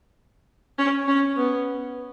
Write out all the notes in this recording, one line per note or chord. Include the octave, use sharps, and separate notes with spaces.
C#4
C#4
B3